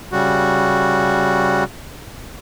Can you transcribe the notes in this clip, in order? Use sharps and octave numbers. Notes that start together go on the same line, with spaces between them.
C#3 G3 F#4